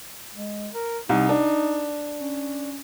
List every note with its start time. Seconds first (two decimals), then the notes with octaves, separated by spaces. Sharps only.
0.35 G#3
0.74 A#4
1.09 C2 D#4
1.29 D4
2.21 C#4